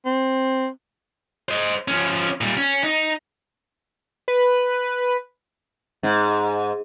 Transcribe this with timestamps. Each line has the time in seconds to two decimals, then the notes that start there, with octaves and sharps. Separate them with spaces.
0.06 C4
1.49 C5 D#5
1.88 F3 C#4
2.41 A#2 G3
2.57 C#4
2.84 D#4
4.28 B4
6.03 G#2